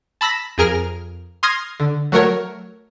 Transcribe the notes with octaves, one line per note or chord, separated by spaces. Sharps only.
A5 B5 E6 A#6 B6
F2 G#4 A#4 F6
C6 D#6 F6 G#6 A#6 C7
D3
F#3 A3 F#4 A#4 C#5